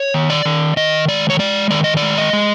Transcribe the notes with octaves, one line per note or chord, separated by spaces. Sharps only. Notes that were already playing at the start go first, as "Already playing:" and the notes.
Already playing: C#5
D#3
D5
D#3
D#3 D#5
G#3 D5
C#5
G#3 D5
D#3 D5
D#5
D5
G#3
D#5
G#3